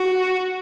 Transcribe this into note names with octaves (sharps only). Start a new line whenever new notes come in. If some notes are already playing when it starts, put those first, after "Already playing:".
Already playing: F#4